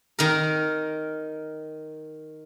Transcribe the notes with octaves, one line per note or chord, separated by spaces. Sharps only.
D#3 A#4